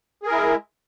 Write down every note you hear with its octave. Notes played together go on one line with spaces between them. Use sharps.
G#3 E4 G#4 A#4